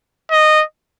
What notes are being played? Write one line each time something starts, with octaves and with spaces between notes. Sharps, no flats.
D#5